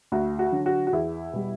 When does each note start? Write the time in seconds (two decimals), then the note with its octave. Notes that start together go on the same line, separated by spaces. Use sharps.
0.12 D2 F#4
0.39 F#4
0.52 D3 F#3
0.66 F#4
0.87 F#4
0.93 E2 E4
1.33 B2 G3